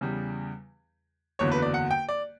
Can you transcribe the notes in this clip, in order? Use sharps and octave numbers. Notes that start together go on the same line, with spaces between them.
E2 C#3 G3
F#1 E2 D3 F#3 C#5
B4
D5
F#5
G5
D5